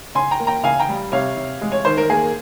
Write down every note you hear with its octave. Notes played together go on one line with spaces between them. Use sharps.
C#3 G#5 C6
G5 A#5
A#3
G5 A#5
C#3 F5 G#5
G5 A#5
G3
C3 C#5 F5
C3
G#3
C#5
D#3 C5
A#4
A#3 G#4